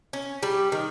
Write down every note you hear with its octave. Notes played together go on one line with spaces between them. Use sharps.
C#4
G3
D#3